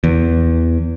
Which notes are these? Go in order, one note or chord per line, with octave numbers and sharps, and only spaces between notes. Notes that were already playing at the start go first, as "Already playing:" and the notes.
E2